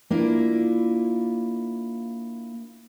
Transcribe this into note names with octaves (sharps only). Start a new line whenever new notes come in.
A#3 D4 E4 F4